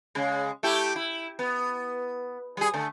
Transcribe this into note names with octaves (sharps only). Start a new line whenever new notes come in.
C#3 G#3
A3 E4 G4
E4
B3
G3 G#4
D3 A3